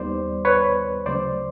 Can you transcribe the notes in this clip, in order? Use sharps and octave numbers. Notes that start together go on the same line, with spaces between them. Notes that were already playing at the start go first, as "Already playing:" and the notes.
Already playing: D#2 D#3 G3 B3 C5 D5
B4 C#5
D2 C#3 F#3 A3 C5 D5